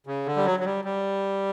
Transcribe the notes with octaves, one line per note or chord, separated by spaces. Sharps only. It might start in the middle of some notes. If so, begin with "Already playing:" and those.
C#3
D3
G3
F#3
F#3
G3
G3